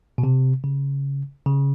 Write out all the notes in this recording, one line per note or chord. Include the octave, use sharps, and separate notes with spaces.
B2
C3
C#3
C#3